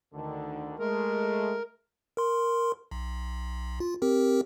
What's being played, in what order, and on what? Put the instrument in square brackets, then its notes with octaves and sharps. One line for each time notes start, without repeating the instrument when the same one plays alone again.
[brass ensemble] D2 D3 D#3
[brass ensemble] G#3 A3 [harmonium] A#4
[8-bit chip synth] A#4 C6
B1
F4
C4 G4 A#4